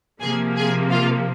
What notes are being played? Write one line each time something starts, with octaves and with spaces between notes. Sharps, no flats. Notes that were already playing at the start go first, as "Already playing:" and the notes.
C3 F3 A#3 G#4 G#5
G#4 G#5
F4 F5